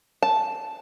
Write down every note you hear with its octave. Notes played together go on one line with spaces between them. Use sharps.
A5